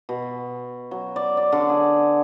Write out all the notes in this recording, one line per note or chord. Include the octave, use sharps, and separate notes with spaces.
B2
F#3
D5
D5
D3
G#4